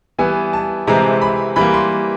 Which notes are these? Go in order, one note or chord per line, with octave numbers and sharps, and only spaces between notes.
E3 G3 B3 G#5
A5
C3 E3 G#3 C4 A#5
B5
E3 G3 A#3 B5
C6